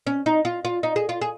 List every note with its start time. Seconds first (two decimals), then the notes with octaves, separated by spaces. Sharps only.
0.07 C#4
0.26 D#4
0.45 F4
0.65 F4
0.83 D#4
0.96 G#4
1.09 F4
1.21 G#4